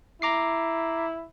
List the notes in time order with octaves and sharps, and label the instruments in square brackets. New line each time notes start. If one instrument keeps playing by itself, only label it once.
[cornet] E4 [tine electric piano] A#5 D6 C7